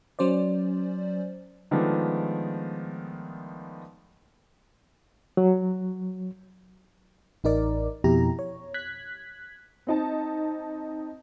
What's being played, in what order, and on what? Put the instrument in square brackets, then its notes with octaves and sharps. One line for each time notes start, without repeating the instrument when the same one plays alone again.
[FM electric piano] F#3 C#4 C5 D5
[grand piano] D#3 F3 G#3 A3 B3 D4
[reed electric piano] F#3
[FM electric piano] A1 D#4 A#4 D5
F2 B2 E4 G4 A#5
C#5
F#6 G#6 B6
[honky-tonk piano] C4 D#4 A5